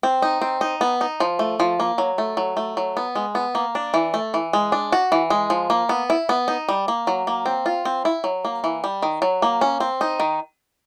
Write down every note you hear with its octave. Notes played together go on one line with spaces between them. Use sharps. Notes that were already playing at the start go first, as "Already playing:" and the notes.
C4
D#4
C4
D#4
B3
D#4
F3
A3
F3
A#3
F#3
A3
F#3
A3
F#3
B3
G#3
B3
A#3
D4
E3
A3
E3
G#3
D4
F#4
E3
G#3
F3
A#3
B3
E4
B3
D#4
G3
A#3
F#3
A#3
C4
F4
C4
E4
F#3
A#3
E3
G3
D#3
F#3
A#3
C#4
C4
D#4
D#3